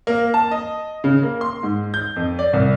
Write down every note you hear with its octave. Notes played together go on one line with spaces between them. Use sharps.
A#3
A5
D#5
C#3
A#3
C6
G#2
G6
F2
D5
C2